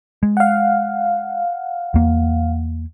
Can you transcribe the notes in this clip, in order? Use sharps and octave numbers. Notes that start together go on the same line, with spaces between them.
G#3
F5 F#5
E2 A#3